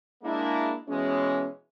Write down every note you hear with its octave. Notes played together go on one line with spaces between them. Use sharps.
G#3 A#3 D4 E4
B2 E3 G#3 C#4